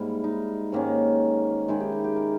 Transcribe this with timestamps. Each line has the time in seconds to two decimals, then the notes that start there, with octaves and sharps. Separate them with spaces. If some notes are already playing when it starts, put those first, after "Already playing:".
Already playing: G#2 G3 A#3 E4
0.24 D#4
0.72 G#2 D#3 A#3 C#4
1.68 D#3 G#3 D#4 E4
1.80 G4
1.92 G4
2.04 G4
2.16 A#4